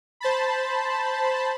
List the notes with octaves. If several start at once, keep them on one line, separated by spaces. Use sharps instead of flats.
C5 A5 B5